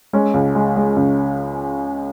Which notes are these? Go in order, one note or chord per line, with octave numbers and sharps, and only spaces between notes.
G#3 C#4
C#2
G#3
G#3
C#2